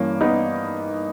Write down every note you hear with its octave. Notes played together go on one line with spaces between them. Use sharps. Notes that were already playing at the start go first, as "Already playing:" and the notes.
Already playing: G2 E3 A#3 C#4
B3 D#4